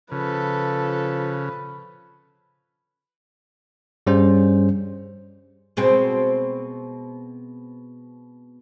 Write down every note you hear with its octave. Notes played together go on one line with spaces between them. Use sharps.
C#3 F3 A4 B4
G2 G3 C#4 G#4 C5
B2 G#3 C4